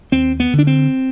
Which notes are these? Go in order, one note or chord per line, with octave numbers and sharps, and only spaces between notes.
D#2 C4
B3
D3
D4
C4